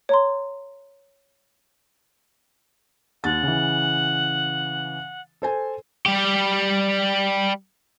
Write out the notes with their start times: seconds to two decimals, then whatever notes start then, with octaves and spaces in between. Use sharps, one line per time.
0.09 C#5 A#5 C6
3.24 D#2 F#5 A6
3.43 C#3 E3
5.42 A4 C5 G#5
6.06 G3 G4